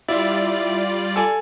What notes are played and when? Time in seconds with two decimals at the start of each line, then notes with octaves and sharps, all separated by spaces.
0.08 G3 E4 F4 D5
1.16 A4 G#5